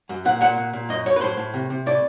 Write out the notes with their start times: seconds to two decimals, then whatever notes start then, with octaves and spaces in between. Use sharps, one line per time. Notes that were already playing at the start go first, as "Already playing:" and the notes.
0.09 F#2
0.25 A#2 F#5
0.41 A#2 F#5
0.57 A#2
0.73 A#2
0.89 F#2 D#5
1.06 F#2 C#5
1.16 B4
1.21 A2 C5
1.37 A2
1.54 C3
1.70 C3
1.86 A2 D5